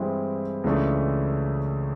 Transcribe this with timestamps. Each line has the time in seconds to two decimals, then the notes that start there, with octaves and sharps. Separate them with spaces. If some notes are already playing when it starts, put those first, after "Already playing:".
Already playing: G2 E3 G#3 C4 E4
0.64 C#2 C#3 E3 A3 D4